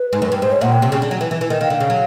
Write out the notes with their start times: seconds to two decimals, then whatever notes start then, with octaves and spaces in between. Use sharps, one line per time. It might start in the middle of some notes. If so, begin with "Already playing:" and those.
Already playing: B4
0.13 G#2
0.22 F#2
0.32 G2
0.42 G#2 C5
0.52 C#5
0.61 A#2 F#5
0.72 G5
0.82 C3
0.92 C#3
1.02 D3
1.11 F#3
1.21 E3
1.31 E3
1.41 E3
1.50 D#3
1.61 D#3 F5
1.70 D3
1.80 C#3
1.90 F#3